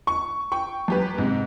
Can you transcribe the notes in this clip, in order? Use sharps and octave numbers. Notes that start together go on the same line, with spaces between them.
C#6
G5 C#6
F#2 G4 B4
G#2 C3